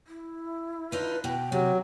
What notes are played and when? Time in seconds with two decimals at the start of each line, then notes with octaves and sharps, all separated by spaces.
0.07 E4
0.92 D4 D#4 F4 B4
1.24 B2 G5
1.52 C3 F#3 G4